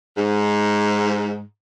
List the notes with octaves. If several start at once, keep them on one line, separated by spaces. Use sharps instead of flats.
G#2